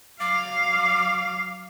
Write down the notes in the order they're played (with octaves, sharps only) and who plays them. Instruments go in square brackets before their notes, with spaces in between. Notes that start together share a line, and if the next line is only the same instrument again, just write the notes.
[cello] F#3 F5 [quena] D6